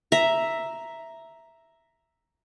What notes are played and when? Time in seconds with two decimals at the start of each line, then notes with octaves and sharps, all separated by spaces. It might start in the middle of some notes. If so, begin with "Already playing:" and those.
0.12 E5 A#5